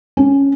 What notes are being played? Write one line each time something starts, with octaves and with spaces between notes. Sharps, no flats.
C#4